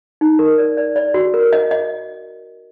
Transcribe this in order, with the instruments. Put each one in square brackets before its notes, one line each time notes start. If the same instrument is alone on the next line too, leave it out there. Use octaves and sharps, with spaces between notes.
[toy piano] D#4
A#4
D5
D5
D5
F#4
A#4
D#5
D#5